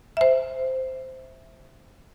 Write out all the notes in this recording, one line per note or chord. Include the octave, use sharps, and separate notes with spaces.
C5 E5